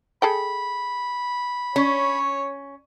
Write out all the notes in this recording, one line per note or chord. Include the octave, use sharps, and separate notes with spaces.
G#4 A4 G5 B5
C#4 C#5